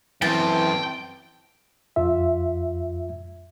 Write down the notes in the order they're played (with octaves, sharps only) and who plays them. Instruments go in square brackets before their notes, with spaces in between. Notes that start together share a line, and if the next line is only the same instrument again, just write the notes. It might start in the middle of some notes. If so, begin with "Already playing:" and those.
[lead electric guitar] F#2 C4 [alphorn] E3 [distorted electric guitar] G5 [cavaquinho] A5
[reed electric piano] F2 F4 E5